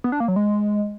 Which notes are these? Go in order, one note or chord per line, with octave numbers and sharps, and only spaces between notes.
B3
D4
A#3
F#3
G#3